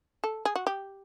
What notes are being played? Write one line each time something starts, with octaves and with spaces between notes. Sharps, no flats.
A4
G#4
F#4
G4